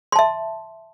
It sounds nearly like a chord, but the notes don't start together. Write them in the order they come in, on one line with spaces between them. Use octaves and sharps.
C6 A5 E5